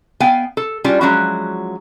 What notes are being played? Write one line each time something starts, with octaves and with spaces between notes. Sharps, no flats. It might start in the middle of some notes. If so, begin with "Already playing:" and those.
B3 F5 G5 G#5
A4
G3 C#4 D4 F4 F#4
F3 F#3 G#3 C#4 E4 F#4